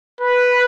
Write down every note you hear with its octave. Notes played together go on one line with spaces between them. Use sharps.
B4